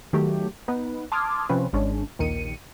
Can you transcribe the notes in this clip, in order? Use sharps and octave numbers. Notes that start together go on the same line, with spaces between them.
D#3 F#3 A3 G4
B3 D#4 B4
A5 C6 D6 D#6 F6 G#6
C3 F3 C4 C#4 F4 B4
G#1 G#3 C#4 D4
A#1 D#2 D#3 C#7 D#7